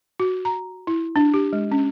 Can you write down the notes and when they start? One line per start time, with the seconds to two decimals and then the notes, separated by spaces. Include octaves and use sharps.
0.20 F#4
0.45 A#5
0.87 E4
1.16 D4
1.34 G4
1.53 G#3
1.72 C#4